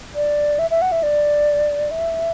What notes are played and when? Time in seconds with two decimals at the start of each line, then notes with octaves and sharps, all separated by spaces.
0.15 D5
0.59 E5
0.71 E5
0.82 F#5
0.92 E5
1.03 D5
1.91 E5